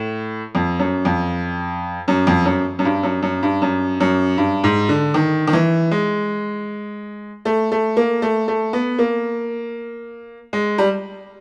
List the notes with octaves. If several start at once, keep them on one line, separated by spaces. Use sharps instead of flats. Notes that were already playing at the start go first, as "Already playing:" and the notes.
Already playing: A2
F2
F#2
F2
F#2
F2
F#2
F#2
G2
F#2
F#2
G2
F#2
F#2
G2
G#2
D3
D#3
D#3
E3
G#3
A3
A3
A#3
A3
A3
B3
A#3
G#3
G3